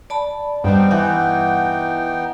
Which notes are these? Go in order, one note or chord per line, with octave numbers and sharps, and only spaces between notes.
D5 A5 B5
G2 G3 B3 C4 D#4 G5
E3 F#5